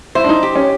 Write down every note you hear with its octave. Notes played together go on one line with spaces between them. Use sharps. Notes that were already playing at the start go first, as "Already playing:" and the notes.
E4 C5
D4
D#4
G4
C#4